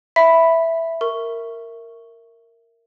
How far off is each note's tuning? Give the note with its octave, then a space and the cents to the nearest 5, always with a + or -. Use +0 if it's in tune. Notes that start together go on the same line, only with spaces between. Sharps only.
E5 +0 B5 +0
A#4 -15 C#6 +0